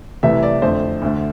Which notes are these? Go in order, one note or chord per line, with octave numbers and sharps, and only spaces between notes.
C2 C3 E3 A3 E5
D5
F2 D3 A3 C5
D2 D3 A3